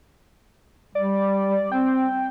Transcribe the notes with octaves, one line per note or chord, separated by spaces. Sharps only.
G3 D5
C4 G5